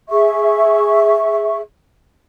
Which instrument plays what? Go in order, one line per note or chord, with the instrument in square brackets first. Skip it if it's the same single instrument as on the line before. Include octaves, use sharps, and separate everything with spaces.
[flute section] G#4 E5 C#6